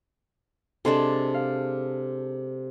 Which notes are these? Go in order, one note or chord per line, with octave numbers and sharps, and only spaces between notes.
C3 G#3 D4 A4 A5 C6
F5